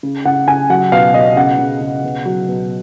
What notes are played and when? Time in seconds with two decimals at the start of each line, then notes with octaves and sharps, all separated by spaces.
0.03 C#3
0.25 C#3 F#5
0.48 C#3 G#5
0.70 F#3 F#5
0.92 B2 F5
1.14 B2 D#5
1.36 C#3 F#5
1.59 C#3
1.81 C#3
2.04 B2
2.26 F#3
2.48 B2